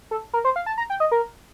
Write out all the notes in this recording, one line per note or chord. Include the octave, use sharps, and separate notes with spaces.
A4
A#4
C5
F5
A5
A#5
G5
D#5
A#4